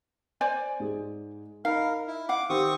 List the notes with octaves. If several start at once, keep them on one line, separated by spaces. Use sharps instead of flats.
C5 D5 G#5
G#2 G#4
D#4 A#4 F5 B5
E4
F5 F#5 D6
D#3 C4 G4 C5 C#6 D#6